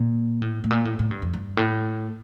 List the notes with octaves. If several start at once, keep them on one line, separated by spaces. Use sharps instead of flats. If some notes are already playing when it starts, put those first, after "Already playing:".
Already playing: A#2
A2
A2
A#2
A2
A2
G2
F2
G2
A2